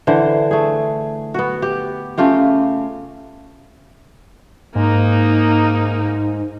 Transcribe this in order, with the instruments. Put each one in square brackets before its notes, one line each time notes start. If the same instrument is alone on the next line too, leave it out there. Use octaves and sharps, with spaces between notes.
[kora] D3 E3 C5
A3 G#4
B3 F#4
G4
C#3 A3 F4 G4
[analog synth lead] G#2 [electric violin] A#3 D#4